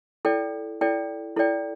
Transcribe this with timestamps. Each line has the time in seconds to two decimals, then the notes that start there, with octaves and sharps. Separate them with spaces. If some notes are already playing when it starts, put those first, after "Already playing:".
0.25 E4 A4 D5 G5
0.81 E4 A4 D5 G5
1.36 E4 A4 D5 G5